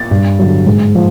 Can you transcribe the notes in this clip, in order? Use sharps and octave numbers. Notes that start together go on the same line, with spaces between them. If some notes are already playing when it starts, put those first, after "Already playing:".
Already playing: A6
G2
D3 F#3
G#2
F3